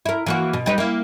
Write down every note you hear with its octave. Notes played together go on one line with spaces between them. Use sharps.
E4 A#4
E3 A#3 F#4
B2
G3 D#4 B4
A#3 E4